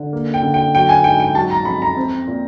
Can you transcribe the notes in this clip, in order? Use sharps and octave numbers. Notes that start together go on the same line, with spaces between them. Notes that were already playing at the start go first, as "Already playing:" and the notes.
Already playing: D3
A#3
G5
D3
G5
F#3 G5
G#5
G#2 G5
G5
F#3 A5
A#5
F2 B5
A#5
C4
A#2